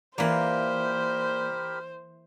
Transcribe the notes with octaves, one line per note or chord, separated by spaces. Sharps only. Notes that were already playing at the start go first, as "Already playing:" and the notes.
A#2 E3 A#3 G4 A#4 C5 B5 C6